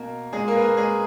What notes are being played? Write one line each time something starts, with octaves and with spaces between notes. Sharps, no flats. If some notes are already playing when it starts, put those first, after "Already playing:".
Already playing: B2 A#3 A#4
A#2 G#3 G#4
A#3 A#4
B4
A#3 A#4
G#3 G#4